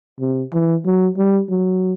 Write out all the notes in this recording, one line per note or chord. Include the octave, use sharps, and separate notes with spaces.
C3
E3
F#3
G3
F#3